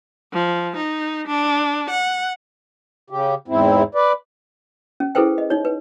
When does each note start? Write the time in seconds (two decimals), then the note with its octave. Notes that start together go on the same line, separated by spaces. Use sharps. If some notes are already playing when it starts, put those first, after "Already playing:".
0.33 F3
0.77 D#4
1.27 D4
1.90 F#5
3.10 C#3 G4
3.48 E2 G#2 C4 E4
3.95 B4 D5
5.00 C#4
5.15 E4 G#4 A4 B4 C5 G5
5.38 D#5
5.50 D#4 C#5
5.65 B4